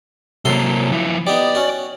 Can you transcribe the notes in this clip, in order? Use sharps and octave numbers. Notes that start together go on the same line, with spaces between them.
F#2 C3 A#3 A4 C6
F3 E4
B3 D#4 G4 D5
C#4 F#4